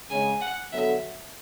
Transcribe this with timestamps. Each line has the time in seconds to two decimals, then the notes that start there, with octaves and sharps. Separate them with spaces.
0.10 C#3 G#3 C#4 G#5
0.41 F#5
0.72 D3 F#3 B3 F#4 A4 E5